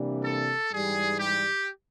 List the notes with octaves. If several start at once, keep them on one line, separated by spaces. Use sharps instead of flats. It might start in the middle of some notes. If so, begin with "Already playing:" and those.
Already playing: C3 E3 G3 A#3 D4
A4
G#2 E3 G3 G#4
G4